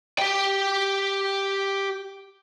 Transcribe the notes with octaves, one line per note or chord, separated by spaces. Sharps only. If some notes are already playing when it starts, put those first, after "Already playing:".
G4 G5